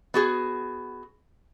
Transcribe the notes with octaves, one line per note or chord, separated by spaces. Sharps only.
B3 F#4 G#4